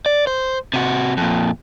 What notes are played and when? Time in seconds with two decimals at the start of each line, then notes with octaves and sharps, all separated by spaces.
0.06 D5
0.27 C5
0.74 C3 F#4
1.17 F2 A#2